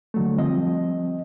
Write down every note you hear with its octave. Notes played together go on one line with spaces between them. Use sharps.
D3 F#3 A3
F3 G3 C4 D#5